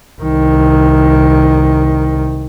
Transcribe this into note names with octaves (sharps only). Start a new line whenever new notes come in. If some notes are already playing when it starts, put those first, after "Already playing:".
C2 D#3